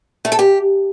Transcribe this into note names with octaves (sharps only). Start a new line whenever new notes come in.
A3
A4
G4